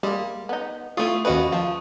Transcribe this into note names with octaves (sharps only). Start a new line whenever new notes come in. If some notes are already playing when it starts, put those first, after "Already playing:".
G3 G#3 A#3
B3 D#4
A3 B3 E4 F4 C#6 D#6
D#2 F3 C#4 F#4 B4 D#5
F3 F5 A5